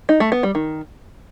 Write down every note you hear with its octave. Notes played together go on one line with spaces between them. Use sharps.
D#4
A3
B3
G3
D#3